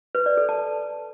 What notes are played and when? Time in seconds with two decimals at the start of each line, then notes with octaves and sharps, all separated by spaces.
0.15 B4
0.26 D5
0.37 A4
0.49 A5